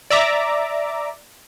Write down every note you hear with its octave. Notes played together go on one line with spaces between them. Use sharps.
D5 E5 A#5 D6